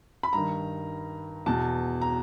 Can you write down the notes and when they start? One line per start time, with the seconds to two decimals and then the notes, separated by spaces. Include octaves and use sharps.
0.23 B5
0.33 G2 D#3 A#5
1.46 E2 B2 A5
2.02 A#5